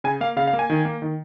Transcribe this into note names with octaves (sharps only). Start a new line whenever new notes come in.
C#3 G#5
A#3 F5
C#3 F5
F5
A#3
G#5
D#3
A#3
D#3